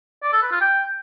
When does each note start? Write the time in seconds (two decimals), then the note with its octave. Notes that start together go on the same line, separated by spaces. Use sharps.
0.23 D5
0.33 A4
0.42 B4
0.52 F4
0.61 G5